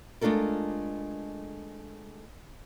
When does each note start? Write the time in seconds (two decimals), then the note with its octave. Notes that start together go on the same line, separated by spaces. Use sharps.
0.21 G#3 A3 D4 F4 A4 A#4